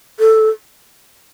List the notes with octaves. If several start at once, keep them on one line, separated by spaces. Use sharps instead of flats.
A4